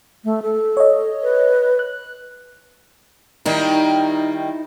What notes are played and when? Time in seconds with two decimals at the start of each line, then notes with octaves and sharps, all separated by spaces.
0.24 A3
0.42 A4
0.77 C#5 D#5
1.23 B4
1.79 F#6
3.46 D#3 G3 A#3 D#4 E4